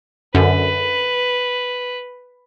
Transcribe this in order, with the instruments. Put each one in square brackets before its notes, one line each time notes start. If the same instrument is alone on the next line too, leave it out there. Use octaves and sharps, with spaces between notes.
[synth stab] F#2 D3 [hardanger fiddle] B4